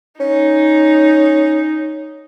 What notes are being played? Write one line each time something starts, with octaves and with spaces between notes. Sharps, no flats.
C#4 D#4